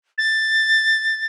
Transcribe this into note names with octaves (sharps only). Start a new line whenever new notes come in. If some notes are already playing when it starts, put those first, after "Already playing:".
A6